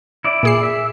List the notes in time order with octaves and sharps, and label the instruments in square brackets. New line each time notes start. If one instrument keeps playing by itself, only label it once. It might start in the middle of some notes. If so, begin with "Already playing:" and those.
[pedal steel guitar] E4 D5
[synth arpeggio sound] A#2 G#4 C7
[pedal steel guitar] E5